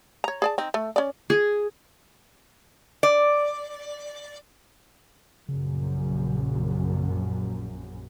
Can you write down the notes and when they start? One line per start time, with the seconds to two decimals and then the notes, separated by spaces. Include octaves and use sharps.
0.24 C#5 A#5
0.42 G#4 D5 A5
0.58 C4 D#4
0.74 A3
0.96 C#4 D5
1.30 G#4
3.03 D5
5.49 A#1 F#2 C#3